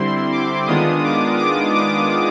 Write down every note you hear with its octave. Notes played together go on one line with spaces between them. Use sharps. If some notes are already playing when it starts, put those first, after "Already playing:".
Already playing: D3 G3 C4 E4 C6
D6
D#3 G#3 B3 D4 F4 D#6
D6
D6
D6